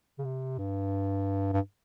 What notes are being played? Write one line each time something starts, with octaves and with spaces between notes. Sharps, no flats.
C#3
C3
G2
G2